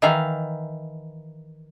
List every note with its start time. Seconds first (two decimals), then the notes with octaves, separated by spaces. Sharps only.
0.02 D#3 E3 E5 F5 A#5